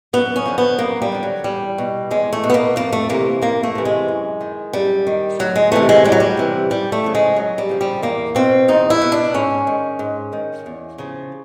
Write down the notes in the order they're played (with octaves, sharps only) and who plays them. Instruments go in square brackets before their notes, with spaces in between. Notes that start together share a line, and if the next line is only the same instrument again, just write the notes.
[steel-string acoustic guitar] F#2 B3
C#4
D3 F3
B3
F#2 A#3
G3
D3 F3
F#3
E2 G3
B2
E2 G#3
A3
B2
B3
A#3
F2 A#3
A3
C3 E3 A#3
F2 A#3
A3
C3 E3
G#3
F#2
D#3
F#2 G3
D#3
D2 F#3
G#3
C3 E3 A3
G#3
D2 G3
F#3
G3
C3 E3
F#2 G3
A3
C#3 F3
G#3
F#2 F#3
G3
C#3 F3
G3
E2 A#3
B2 C4
E2 D#4
E4
B2
D4
G#2 C#4
D#3
G#2
D#3
E2
C#3 F3